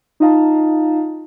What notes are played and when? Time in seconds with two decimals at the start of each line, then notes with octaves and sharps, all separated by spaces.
0.20 D#4 F4 D#5 F5 A5 A#5